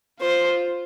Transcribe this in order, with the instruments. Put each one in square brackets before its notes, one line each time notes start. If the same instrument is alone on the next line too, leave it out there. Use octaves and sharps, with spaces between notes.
[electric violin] F4 [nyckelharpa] C5